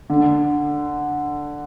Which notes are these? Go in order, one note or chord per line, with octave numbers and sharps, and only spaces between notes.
D3